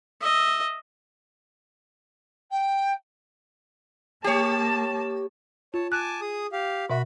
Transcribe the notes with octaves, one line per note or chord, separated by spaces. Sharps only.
D#5 E5
G5
A#3 G4 C#5 A5
F4 C#5 A5
G#5 A5 D6 F#6
G#4 D#6
G4 F5
B2 F#4 E5 B5